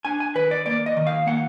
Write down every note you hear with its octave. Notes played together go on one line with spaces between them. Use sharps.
D4 G#5
G#5
D#3 B4
D5
A#3 D5
D#5
D#3
F5
A#3 F#5